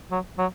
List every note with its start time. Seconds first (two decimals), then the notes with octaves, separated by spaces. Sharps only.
0.11 F#3
0.38 F#3